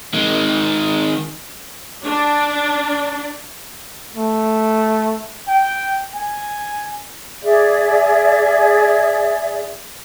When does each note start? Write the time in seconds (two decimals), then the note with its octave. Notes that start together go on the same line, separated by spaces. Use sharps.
0.14 D#3 G#3
2.06 D4
4.16 A3
5.48 G5
6.14 G#5
7.43 G#4 D5 E5